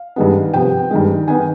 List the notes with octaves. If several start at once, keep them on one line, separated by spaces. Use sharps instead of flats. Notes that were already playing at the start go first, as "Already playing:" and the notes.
Already playing: F5
G2 D#3 G#3 B3
C3 F3 B3 G5
G2 D#3 G#3
D#3 B3 D#4 G#5